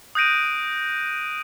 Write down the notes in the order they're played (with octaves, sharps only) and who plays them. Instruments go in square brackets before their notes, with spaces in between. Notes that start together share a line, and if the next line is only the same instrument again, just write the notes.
[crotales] D#6 F#6 G6 A#6 D7 D#7